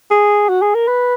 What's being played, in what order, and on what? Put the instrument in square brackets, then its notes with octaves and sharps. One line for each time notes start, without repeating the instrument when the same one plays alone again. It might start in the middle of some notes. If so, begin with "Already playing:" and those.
[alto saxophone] G#4
F#4
G#4
A#4
B4